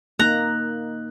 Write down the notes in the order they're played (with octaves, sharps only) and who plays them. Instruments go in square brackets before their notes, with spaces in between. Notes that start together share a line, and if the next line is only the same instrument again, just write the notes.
[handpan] A#3 D#4 [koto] A#5 [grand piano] F#6